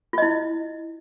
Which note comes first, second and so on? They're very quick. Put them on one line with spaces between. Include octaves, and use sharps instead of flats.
F4 D#5 E4